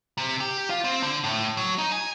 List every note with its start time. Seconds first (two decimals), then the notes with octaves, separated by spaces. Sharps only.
0.17 C3
0.40 G4
0.70 F4
0.84 C4
1.03 D3
1.24 A2
1.57 F#3
1.78 D#4
1.92 G#5